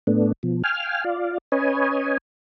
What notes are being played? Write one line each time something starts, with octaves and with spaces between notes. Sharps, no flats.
A2 A3 B3 D4
B2 F3
F5 G5 G#5 F6
F4 D5 F5
C#4 B4 C#5 D#5 G#5